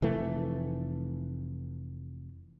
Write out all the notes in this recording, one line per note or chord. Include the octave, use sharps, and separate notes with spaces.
F1 E3 A3